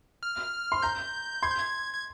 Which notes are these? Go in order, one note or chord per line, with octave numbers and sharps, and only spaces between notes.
F6
C6
A#5 G6
C6 G#6
G6
G#6
G#6